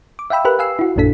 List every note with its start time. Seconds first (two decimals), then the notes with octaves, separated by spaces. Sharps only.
0.19 D6
0.30 E5 F5 G5 B5 E6
0.45 G4 A#4 B4 B5 F#6
0.59 F5 G#5 E6 C7
0.79 E4 F#4
0.96 A#1 F#2 A#2 D4 A4 B6